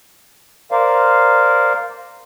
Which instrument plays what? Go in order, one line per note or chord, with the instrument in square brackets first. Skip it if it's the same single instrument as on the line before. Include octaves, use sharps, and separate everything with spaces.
[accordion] A#4 C5 D5 F5